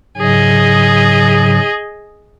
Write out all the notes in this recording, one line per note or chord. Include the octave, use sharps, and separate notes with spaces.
G#2 C#3 F#3 G#4 D#5